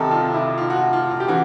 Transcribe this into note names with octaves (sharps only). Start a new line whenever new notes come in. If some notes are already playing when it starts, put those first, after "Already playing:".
Already playing: C2 C3 D#3 A4
F4
E4
F4
F#4
F4
F4
F4
G4
C#3 E3 F#4